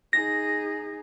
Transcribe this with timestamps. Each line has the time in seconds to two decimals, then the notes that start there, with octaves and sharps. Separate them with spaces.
0.13 D#4 G#4 A#6